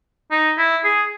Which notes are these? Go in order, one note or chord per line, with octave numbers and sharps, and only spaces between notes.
D#4
E4
G#4